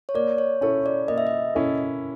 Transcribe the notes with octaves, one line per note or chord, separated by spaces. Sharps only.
C#5
A#3 D5
C#5
C#4 E4 A4 C#5
D5
A#3 D#5
E5
D#5
C#4 E4 A4